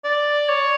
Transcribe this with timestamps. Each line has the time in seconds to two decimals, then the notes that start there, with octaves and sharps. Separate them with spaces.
0.04 D5
0.49 C#5